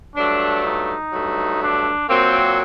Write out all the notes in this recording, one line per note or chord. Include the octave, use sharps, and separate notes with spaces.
G2 F#3 A3 D4
D#4
G2 F#3 A3
D4
A#2 F#3 A#3 C4